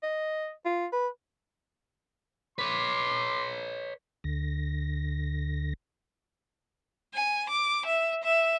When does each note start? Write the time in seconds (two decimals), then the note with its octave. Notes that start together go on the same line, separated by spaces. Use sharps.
0.03 D#5
0.65 F4
0.92 B4
2.58 B4 C#5 C6 D6
4.24 D2 D3 A#6
7.14 G#5
7.50 D6
7.86 E5
8.24 E5